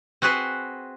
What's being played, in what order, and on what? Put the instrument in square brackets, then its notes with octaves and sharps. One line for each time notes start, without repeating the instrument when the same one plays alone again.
[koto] C4 F#4 G#4 B4 C5